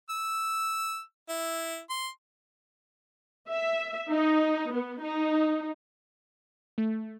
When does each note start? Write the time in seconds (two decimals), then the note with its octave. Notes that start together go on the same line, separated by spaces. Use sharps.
0.10 E6
1.29 E4
1.90 C6
3.48 E5
4.11 D#4
4.73 B3
5.02 D#4
6.78 A3